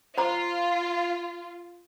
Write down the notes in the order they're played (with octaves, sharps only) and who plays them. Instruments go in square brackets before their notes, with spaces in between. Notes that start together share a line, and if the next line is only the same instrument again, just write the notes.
[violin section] F4 [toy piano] C5 A#5 D6